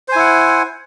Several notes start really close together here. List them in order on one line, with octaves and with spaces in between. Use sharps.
C5 G#5 E4 F#5